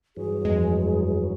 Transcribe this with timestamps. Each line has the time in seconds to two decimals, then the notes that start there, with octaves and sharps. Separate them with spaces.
0.17 G2 E3 F#3 G#4
0.45 F2 G#3